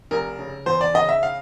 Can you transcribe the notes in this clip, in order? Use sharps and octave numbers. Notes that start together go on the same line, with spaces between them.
F1 A#4
C#3
E2 C5
D5
C#3 D#5
E5
F5